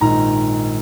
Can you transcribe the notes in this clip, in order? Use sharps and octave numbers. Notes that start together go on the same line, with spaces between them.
A#1 G#2 D#3 A#5